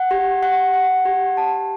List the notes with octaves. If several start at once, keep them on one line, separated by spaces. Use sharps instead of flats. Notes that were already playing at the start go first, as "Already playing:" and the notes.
Already playing: F#5
G4
F#5
F#5
G4
A5